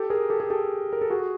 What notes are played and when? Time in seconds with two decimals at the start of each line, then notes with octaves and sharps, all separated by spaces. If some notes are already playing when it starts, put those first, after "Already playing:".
Already playing: G4 A4
0.10 G#4 A#4
0.30 G4 A4
0.40 G#4
0.50 G4 A4
0.93 A#4
1.01 A4
1.10 F#4 G#4